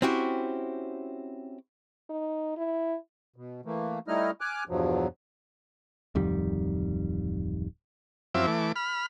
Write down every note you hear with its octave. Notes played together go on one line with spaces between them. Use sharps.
C4 C#4 E4 F#4 G4
D#4
E4
B2
E3 A3 A#3
G3 A3 D#4 E4 D#5 F6
G#5 D6 F6 F#6
E2 G2 B2 F3 F#3
D1 F2 D#3 G3
F#2 F3 C4 E4 E5 D6
E3 A3 D6
B5 F6